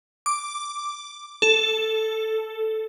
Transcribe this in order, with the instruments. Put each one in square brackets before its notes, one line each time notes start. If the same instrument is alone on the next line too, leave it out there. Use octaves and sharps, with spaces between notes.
[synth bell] D6
A4